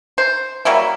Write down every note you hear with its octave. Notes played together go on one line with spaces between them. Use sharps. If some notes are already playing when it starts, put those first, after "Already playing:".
C5
F#3 G3 A#3 E4